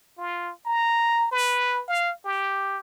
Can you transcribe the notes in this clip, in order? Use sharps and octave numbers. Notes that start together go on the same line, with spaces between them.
F4
A#5
B4
F5
G4